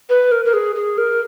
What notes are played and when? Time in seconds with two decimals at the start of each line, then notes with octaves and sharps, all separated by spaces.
0.09 B4
0.31 A#4
0.45 A#4
0.53 G#4
0.75 G#4
0.98 A#4